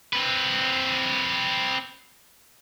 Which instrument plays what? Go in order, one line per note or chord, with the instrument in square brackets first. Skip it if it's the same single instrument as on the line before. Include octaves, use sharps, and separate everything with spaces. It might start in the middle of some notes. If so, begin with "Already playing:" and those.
[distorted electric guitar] C4 B4